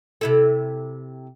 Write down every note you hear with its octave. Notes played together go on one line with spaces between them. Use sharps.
C3 E4 A4